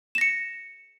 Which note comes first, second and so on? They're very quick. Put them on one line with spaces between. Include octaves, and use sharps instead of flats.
E7 A#6 C#7